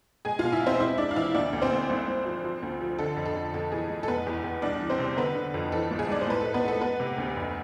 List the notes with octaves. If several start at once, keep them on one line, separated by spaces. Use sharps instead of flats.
G#3 G#4 G#5
B2 F4 F5
E4 E5
E2 C4 C5
G#3 E4 E5
G#3 D4 D5
F5
E3 E4 E5
D2 D4 D5
D2
C4 C5
D2
G#1
G#1
F3
F3
D2
F3
D3 A4
F2
A4
F2
F2 A4
E3 G#4
G#3
A4
F1 B3 B4
E2
E2
C2 D4 D5
E3
C4 C5
C3
D3 B3 B4
D3
F2
E3 A4
G#1
G#4
G#2 D5
C5
A2 B4
G#3 A4
B3 B4
G#3 A4
G#3 B3 B4
C3
D2
F1